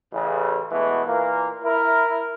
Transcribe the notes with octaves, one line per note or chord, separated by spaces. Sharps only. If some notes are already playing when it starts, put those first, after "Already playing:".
A1 C#3
B2 E3 G#3 A3 B3
A#2 E3 A#3
E4 A#4